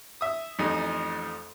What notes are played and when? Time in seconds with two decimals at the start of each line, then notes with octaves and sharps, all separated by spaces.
0.21 E5 D#6
0.59 A1 F2 D#4